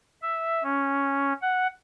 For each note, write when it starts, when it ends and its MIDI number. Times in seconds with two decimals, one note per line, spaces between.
0.22 0.63 76
0.63 1.33 61
1.42 1.67 78